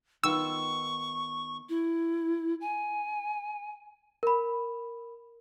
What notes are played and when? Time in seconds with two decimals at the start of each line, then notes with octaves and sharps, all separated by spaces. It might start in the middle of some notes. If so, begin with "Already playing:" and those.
0.24 D#3 B3 F4 C#6 E6
1.69 E4
2.61 G#5
4.23 A#4 B5